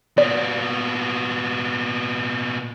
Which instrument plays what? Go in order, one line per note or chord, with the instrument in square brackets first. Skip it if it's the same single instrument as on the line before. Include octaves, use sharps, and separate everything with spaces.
[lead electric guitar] A#2 B3 [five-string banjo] D5